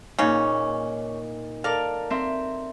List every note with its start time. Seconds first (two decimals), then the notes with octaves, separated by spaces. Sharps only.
0.19 A#2 C#3 C#4 D#4
1.64 A4 A#4 D5 F5
2.10 C4 E5 C6